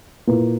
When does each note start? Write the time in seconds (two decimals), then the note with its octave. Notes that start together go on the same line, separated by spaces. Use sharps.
0.27 A#2 A#3 E4 B4